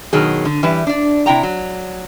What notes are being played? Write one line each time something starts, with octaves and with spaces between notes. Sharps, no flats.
B2 D#3 F#3 G#4
D3
E3 G3 E4 B4
D4 D5
C3 E4 G5 A#5
F#3